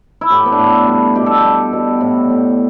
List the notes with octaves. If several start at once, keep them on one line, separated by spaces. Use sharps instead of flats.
E4
A2 G4
B3
D4
A2
G3
B2 G4
A4
G4
G3
B2
A2
A2